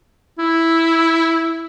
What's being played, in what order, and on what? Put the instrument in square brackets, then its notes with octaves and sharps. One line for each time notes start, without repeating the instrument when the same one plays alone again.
[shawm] E4